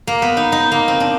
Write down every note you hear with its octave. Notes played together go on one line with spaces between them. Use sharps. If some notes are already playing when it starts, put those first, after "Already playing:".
A#3
B3
D#4
D#4
A#3
C4
D4